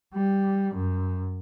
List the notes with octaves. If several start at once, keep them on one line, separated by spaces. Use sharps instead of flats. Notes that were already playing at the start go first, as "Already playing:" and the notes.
G3
F#2